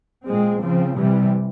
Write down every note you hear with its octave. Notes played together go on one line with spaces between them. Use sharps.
A#2 G#3 C4
C#3 F3 C4
C3 E3 G3